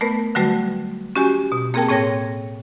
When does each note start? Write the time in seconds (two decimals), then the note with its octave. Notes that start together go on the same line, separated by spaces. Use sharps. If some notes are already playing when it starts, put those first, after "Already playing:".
0.01 A3 B3 A#4 B4
0.35 D3 F#3 G3 A3 F#4 B4
1.16 C#4 F#4 G4 G#5
1.52 B2
1.74 A#3 C4 G#4 A#4 G5 A5
1.88 A2 C4 G#4 C#5 G5 A#6